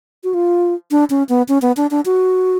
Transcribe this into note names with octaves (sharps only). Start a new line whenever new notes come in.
F#4
F4
D4
C#4
B3
C#4
B3
D4
D4
F#4